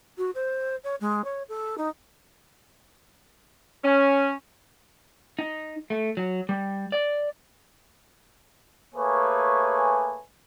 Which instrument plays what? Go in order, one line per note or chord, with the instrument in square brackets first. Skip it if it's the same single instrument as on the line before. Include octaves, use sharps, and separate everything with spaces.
[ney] F#4
C5
C#5
G#3
C#5
A4
D#4
[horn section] C#4
[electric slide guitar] D#4
A3
F#3
G3
D5
[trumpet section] A3 A#3 G#4 B4 C#5 G#5